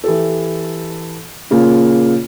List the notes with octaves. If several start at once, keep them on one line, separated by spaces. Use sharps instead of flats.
E3 G4 A4
A#2 C#3 A#3 F4